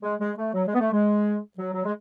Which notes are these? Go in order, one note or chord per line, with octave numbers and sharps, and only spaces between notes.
G#3
G#3
A3
F#3
G#3
B3
A3
G#3
F#3
F#3
G#3